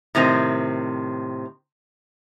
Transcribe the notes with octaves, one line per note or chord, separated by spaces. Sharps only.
A2 C3 D#3 C4